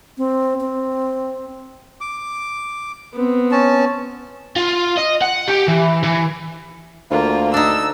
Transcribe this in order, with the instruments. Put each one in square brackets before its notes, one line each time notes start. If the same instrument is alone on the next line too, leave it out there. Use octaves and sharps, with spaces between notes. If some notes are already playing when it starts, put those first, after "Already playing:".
[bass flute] C4
C4
[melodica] D6
[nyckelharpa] B3 C4
[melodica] C#4 A5
[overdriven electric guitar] F4
D#5
F#5
G4
E3
E3
[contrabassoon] D2 [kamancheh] A#3 F4
[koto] D4 D#4 [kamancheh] E6